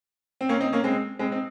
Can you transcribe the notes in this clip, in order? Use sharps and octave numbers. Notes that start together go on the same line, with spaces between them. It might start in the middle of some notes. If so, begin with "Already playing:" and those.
C4
A#3 C#4
C4 D#4
A#3 C#4
G#3 C4
G#3 C4
C4 D#4